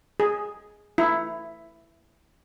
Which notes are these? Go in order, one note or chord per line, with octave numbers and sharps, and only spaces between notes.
G#4
E4